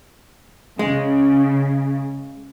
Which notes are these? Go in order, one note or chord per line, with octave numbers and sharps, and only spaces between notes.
C#3 G#3